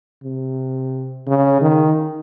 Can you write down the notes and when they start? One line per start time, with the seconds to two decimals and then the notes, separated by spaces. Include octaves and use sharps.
0.24 C3
1.27 C#3
1.61 D#3